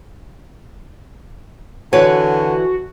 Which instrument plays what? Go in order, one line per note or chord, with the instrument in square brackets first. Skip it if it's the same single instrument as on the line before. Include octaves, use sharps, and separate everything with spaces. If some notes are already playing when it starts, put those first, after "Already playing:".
[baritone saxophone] D3 [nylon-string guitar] E3 B4 C#5 [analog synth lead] F#4